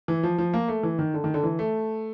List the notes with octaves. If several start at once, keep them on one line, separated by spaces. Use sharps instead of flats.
E3
F3
F3
A#3
A3
E3
D#3
D3
D#3
D3
E3
A3